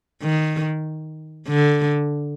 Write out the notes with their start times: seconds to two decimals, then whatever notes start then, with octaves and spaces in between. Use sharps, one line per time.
0.23 D#3
1.48 D3